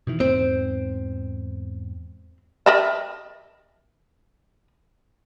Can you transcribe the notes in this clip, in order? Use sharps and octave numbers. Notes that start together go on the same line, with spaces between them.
B2 D#3 E3
E2 G#2 C4
A#4 D#5 E5